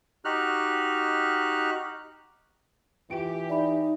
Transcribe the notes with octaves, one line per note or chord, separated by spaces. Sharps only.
D#4 F#4 G4 F6 F#6
E3 F4 G4 G5 D7
D#4 D5 E5 B5